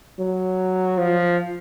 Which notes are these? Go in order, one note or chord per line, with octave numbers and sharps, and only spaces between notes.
F#3
F3